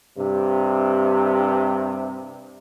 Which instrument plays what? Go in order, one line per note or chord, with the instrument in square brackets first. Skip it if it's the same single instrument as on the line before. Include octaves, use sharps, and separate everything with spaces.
[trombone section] G2 C3